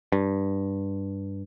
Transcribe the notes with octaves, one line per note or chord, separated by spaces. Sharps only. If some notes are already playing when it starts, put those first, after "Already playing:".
G2